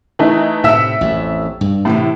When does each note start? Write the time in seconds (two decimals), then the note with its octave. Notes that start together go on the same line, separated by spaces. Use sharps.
0.19 E3 A3 D#4
0.64 A2 C3 E5 E6
1.01 A1 F2
1.61 G2
1.85 A2 C3 D#3 E3